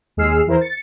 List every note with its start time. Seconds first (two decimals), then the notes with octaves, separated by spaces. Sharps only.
0.17 D#2 G#3 G#4 E6 F6 C7
0.47 E2 E4 A#4 C5
0.61 A6 C#7